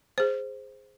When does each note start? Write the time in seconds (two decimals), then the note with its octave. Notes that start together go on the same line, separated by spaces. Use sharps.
0.18 G#4 C5